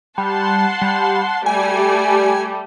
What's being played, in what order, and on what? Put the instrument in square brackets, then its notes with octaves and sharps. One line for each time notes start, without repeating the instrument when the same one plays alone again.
[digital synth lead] G3 [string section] F#5 A5 C6
[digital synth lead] G3
[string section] G3 A3 G4 [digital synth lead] G#5